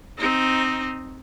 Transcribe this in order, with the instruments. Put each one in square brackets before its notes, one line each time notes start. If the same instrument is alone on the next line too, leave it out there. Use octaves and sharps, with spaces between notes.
[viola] C4 D#4